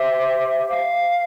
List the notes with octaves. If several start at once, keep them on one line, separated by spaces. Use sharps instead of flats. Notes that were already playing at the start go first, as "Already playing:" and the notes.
Already playing: G4 C5 E5
F5